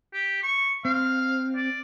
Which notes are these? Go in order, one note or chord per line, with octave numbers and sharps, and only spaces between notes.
G4
C#6
C4 F5
D5